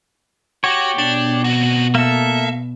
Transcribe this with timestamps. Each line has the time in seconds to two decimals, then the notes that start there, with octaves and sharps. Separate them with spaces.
0.64 F#4 G4 C#5
0.98 B2 D4
1.44 C4 F#4
1.95 A#3 A4 E5